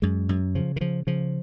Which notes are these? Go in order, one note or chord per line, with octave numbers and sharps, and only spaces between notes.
F#2 G#3
F#2
C#3 F3
D#3
C#3 F3
C#3 F3